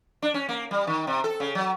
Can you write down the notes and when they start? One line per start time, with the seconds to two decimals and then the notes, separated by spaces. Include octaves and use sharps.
0.22 D4
0.34 C#4
0.49 A#3
0.71 G3
0.87 D#3
1.07 C3
1.24 A4
1.40 C#3
1.55 F#3